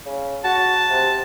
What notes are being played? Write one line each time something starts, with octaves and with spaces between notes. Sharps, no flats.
C#3
F#4 A5
C3